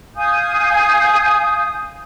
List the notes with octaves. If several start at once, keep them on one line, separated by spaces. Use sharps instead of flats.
F5 G#5 D#6 G6